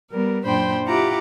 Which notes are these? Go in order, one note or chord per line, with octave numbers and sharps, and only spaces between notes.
G3 B3 A#4
F#2 A#2 D4 C5 G5 B5
E4 F4 G4 F#5 A#5 D6